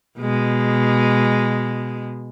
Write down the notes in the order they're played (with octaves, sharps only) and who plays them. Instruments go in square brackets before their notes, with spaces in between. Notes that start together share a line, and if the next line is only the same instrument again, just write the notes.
[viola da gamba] B2 G#3